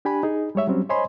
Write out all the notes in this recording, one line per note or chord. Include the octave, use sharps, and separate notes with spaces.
D4 G4 G#5 B5
D#4 G#4
G3 G#3 C#5 E5
F#3 G3 C4 C#4
C5 C#5 D#5 G#5 B5 C6